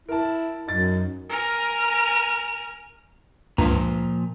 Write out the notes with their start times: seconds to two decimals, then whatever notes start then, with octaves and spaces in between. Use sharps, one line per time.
0.09 E4 A#4 A5
0.67 F#2 D#4 A6
1.29 A#4 G#5 F6
3.58 C#2 G2 A#2 F3 A#5